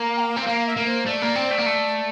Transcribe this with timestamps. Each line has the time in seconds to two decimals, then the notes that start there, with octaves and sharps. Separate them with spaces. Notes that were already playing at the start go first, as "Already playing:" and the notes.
Already playing: A#3
0.17 G5
0.20 F5
0.37 C4
0.47 A#3 F5
0.67 E5
0.77 A#3 A#4
0.87 C5
1.06 A3 D5
1.22 A#3
1.36 C4
1.51 A3
1.58 A#3
1.66 A3